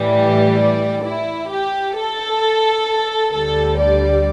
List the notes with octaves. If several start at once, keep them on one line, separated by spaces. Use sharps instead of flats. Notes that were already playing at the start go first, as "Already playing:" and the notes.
Already playing: A2 E3 G3
G4
D5
E4
G4
A4
D2 D3 G3 A4
D5